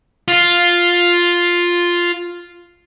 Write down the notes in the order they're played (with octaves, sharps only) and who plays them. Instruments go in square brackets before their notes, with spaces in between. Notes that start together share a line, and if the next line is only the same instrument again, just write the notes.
[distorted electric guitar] F4 F5